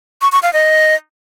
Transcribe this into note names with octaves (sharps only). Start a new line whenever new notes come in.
C#6
C#6
F5
D#5